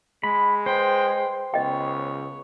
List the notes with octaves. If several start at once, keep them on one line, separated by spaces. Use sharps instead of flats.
G#3 B5
B4 C5 G5
C#2 B3 C#5 D#5 G5